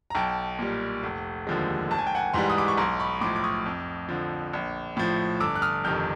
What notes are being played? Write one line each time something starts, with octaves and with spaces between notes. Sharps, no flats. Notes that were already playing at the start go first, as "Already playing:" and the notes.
A#5
B1 G5 A5
A#2 G3
F1
D#2 D3 F3 G#3
G#1 A5
G#5
G5
F#5 G#5
G#2 E3 G3 A#5 C6
D#6
D6
C#6
B1 A#5 C6
B5 C#6
A2 F3 C6 D6
D6
C#6 D#6
F2
D3 F3
A#1
A2 F3
G1 D6 E6
F#6
D#6 F6
F2 C3 D#3 F6 G6